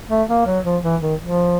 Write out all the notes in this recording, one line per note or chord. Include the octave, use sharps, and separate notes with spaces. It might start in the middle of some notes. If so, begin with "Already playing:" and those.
A3
A#3
F#3
F3
E3
D#3
F3